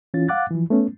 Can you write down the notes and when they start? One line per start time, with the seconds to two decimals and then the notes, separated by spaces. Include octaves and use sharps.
0.14 E3 C#4 F4 A6
0.28 F5 F#5 D6 F#6 A6
0.51 E3 F3
0.70 A3 B3 C#4